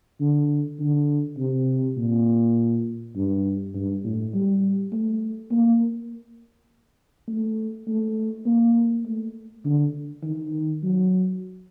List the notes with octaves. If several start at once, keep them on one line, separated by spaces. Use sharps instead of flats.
D3
D3
C3
A#2
G2
G2
A2
G3
A3
A#3
A3
A3
A#3
A3
D3
D#3
F#3